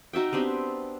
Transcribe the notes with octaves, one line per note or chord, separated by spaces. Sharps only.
D#4 F#4 E5 G5
B3 C4 D4 G4